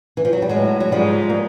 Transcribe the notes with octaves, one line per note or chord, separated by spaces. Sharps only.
E3
F3
F#3
G3
A2 F#3 G#3
F#3
G#2 F3 G3
A#3